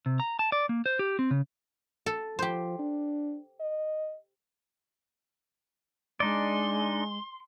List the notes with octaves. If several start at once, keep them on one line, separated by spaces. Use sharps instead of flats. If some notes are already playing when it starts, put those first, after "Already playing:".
C3
A#5
A5
D5
A#3
C5
G4
C4
C#3
A4
F3 G4 C5
D4
D#5
G#3 D4 D#4 D5 C6